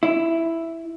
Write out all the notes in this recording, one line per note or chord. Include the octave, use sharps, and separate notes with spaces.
E4